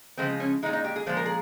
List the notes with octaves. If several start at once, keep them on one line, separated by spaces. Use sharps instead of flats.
C#3 F3 G#3 C4
C#4
A#2 G#3 D#4
D#4
G4
G#4
A#2 F3 G#3 C5
A#4
G#4